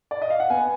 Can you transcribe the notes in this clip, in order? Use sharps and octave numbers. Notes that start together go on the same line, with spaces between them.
D5
D#5
F5
F#5
B3 G#5